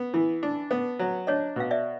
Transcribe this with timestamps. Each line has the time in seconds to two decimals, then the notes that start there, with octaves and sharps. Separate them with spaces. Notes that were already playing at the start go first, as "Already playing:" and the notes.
Already playing: B3
0.14 E3
0.43 D4
0.71 B3
0.99 F#3
1.27 D4 C#5 D#5
1.56 B2 F5
1.71 D5 E5